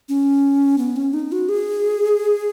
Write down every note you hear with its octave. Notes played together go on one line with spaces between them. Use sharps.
C#4
B3
C#4
D#4
F#4
G#4